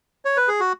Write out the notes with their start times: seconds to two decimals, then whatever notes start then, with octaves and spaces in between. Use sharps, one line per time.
0.25 C#5
0.37 B4
0.48 G#4
0.60 F#4